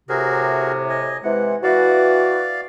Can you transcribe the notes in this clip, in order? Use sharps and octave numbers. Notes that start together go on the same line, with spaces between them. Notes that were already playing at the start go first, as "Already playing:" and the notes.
A2 C3 F#4 G#4 A#4
D#5 G#5
C3 E3 G#3 F#5
E3 F#4 D5 F5